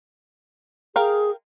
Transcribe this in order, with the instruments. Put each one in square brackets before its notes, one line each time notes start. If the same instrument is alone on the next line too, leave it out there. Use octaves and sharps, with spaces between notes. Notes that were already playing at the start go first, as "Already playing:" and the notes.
[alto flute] G#4 [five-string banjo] A#4 F5 G5